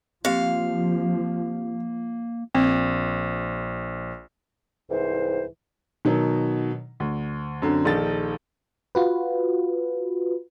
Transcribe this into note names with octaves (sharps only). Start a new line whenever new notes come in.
F3 A#3 C4 G4 F5
A#1 C4
C2 G#2 E3 C5
B2 D#3 F#3
D2
F#2 D3 C4
A#1 D#3 D#4 A4 A#4 A6
F4 F#4 B4